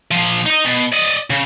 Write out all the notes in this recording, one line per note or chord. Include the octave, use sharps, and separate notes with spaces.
A#2 F3
D#4 D#5
B2
D5 D#5
C#3